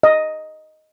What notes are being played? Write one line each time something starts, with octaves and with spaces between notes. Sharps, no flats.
D#5